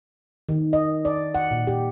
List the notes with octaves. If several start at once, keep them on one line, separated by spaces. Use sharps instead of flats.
D#3
D#5
D5
F#5
A#2
G4